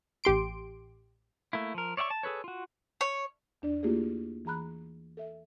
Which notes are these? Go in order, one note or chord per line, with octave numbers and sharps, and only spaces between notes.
A1 G4 C6 D7
A3 A#3 E4
F3 A#4
C#5 D5 E5 F#5 C#6
A5
G#4 A4 B4 C#5
F4 F#4
C#5
E2 D4 D5
A3 A#3 E4 F4 G4 G#4
E3 G#4 A#5 B5 F#6
A4 E5